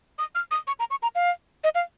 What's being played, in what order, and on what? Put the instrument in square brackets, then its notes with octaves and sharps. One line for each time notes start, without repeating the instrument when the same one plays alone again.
[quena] D#6
F6
D#6
C#6
A#5
C#6
A#5
F5
D#5
F5